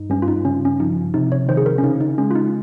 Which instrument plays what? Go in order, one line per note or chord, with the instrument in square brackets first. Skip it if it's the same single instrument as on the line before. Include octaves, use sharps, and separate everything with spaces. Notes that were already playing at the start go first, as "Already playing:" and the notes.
Already playing: [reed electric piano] G2 D#4
[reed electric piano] G2 [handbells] C#4
[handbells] F4
D#4
[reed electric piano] C#3 [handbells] C#4
[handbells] C#4
[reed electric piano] F3 [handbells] D#4
[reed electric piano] C3 [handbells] D#4
[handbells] C#5
[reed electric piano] D#3 [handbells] C5
[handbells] G#4
A#4
C#4
[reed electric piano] C#3 [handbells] D#4
[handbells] D#4
[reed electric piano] G#3 [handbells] C#4
[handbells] F4
D#4